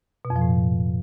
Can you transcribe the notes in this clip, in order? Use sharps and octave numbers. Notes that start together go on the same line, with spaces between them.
B2
F2
F3
A2